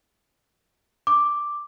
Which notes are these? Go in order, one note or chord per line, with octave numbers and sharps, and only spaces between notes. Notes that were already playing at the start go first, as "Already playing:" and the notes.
D6